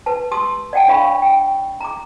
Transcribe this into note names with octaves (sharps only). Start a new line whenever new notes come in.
B4 A5
G4 A5 C6 D#6 E6
D5 F#5 G5 A5
D4 C#5 D5 F5 B5 C#6
G5
A#5 D6